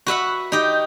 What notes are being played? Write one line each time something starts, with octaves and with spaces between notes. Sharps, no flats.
F#4 B4 E5 F#5
D#4 G4